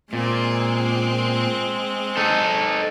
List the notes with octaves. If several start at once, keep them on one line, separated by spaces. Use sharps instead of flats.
A#2 G#3 C4
D#4 A4